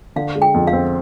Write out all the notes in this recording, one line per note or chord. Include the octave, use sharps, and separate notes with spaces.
D3 F5
G#3
G5
F2
F5
C4